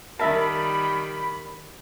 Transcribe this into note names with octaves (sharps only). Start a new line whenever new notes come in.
D#3 G3 A#4 E5 A5 B5